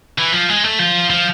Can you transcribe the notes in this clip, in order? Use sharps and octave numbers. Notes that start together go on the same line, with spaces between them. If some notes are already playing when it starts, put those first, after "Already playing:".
E3
F3
G#3
A3
F3
F3